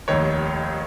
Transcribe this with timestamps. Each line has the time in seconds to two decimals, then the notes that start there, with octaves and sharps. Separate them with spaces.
0.08 F1 D#2 D#3 C#5